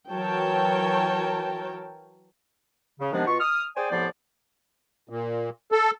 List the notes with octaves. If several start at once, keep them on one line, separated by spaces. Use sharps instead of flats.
E3 F#3 A#4 C#5 G5 A5
C#3
C3 D#3 F3 G#3 B3 D4
B2 F4 C#6
D#6 F6
G#4 C5 D5 G5 G#5
C2 A2 F3 B3 C5 D5
A#2
A4